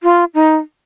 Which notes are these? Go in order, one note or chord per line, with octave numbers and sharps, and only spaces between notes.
F4
D#4